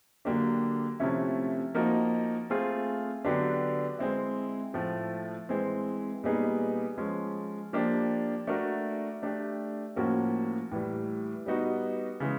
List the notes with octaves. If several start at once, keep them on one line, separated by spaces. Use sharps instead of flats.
D3 F#3 A#3 D4 G4
C3 F3 A3 C#4 E4
F3 A#3 D#4 F#4 A#4
A3 C4 F4 G#4
D3 F#3 B3 D4 G4
G#3 C4 E4
A2 F3 A3
E3 G#3 C4
A#2 G3 B3 D#4 G#4
F3 G#3 C#4
F3 A#3 D4 G4
A3 D4 F#4 A#4
A3 D4 G4
A2 F3 A#3 C#4 F#4
A2 E3 G3
G3 B3 D#4 F#4
C#3 E3 G#3